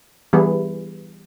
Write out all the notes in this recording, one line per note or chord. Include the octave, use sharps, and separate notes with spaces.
E3 G3 B3 E4 G#4